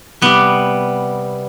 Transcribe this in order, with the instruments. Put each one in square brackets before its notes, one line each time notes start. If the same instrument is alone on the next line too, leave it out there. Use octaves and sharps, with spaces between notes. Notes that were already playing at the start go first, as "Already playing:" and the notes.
[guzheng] C3 G3 B3